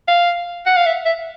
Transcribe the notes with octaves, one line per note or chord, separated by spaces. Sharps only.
F5
F#5
F5
E5
E5